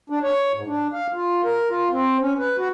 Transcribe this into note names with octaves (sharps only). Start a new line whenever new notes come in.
D4
C#5
G#2
D4
F5
F4
A#4
F4
C4
C#4
B4
F#4